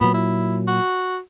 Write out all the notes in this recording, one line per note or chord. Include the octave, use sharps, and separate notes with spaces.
A#2 F#3 B3
E4
F#4